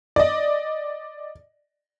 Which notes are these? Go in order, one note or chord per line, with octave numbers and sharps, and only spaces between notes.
D5 D#5